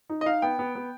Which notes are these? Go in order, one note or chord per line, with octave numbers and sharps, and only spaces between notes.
D#4
D#5
D#4 F5
B3 G5
B3
B3